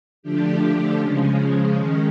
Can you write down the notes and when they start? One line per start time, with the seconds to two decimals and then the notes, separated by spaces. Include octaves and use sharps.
0.23 D3 F3 A3 D4 G4
0.99 C#3 F3 G#3 C#4
1.76 D#3 G#3 C#4